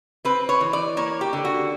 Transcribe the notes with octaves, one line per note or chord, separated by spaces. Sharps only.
C4 B4
C#5
E3
D5
A#3 C#5
G4
D3
F#4